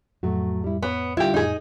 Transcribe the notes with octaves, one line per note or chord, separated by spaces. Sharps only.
F2 A2 F#3 A3 F#4
G3 E4
B3 B4 C#5
D3 G3 E4 F4 G4
F2 A2 D#4 G#4 G#5